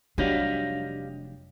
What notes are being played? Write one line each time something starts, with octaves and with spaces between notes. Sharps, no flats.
F1 F#3 G3 D4 G4 D#5 F5